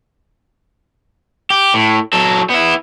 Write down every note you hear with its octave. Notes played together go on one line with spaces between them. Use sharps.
G4
A2
F#3 A4
B3 E4